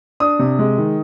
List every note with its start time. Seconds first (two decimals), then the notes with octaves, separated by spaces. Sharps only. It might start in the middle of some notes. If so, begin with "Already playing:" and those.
0.20 D4 D#6
0.39 C3
0.59 G#3
0.78 D#3